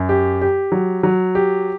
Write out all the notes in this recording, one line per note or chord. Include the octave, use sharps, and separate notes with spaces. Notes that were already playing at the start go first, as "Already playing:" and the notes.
Already playing: F#2
G4
G4
F#3
F#3
G4